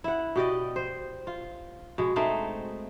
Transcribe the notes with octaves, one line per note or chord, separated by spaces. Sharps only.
E4 F#5
B2 G4 D5 D#5
C5
F4
B2 G#3
G#3 A3 C4 D#4